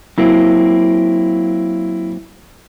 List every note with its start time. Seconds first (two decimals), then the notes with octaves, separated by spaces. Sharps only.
0.18 F#3 A#3 C4 E4